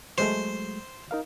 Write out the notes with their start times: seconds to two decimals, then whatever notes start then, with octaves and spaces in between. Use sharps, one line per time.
0.18 F#3 G#3 A3 C5
1.11 D#4 A#4 F5